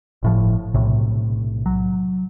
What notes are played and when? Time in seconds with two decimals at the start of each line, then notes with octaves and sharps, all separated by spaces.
0.23 G1 A2 F3
0.74 B1 A2 C3
1.66 F#3